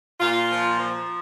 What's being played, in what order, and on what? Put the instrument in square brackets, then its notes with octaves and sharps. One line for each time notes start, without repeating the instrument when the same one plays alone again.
[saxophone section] A#2 F4
F3
F3